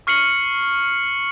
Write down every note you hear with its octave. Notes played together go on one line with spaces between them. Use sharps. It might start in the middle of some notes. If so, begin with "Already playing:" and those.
C#6 F6 C7 C#7 F#7